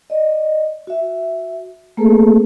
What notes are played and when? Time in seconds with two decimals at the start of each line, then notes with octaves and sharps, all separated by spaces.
0.10 D5 D#5
0.87 F#4 E5
1.97 A3 A#3 C4 G#4 A4 B4